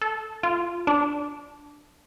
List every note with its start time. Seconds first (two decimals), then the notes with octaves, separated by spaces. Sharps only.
0.01 A4
0.43 F4
0.87 D4